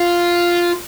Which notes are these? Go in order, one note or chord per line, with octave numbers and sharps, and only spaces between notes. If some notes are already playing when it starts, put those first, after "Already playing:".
Already playing: F4